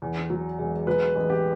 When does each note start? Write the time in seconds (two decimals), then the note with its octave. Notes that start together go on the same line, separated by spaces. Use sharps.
0.02 E2
0.30 F#3
0.58 E1
0.87 F#3 B4
1.15 A1
1.30 G4